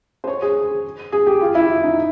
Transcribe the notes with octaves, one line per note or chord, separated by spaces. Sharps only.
C5
C#5
G#4
G#4
G4
F4
E4
D#4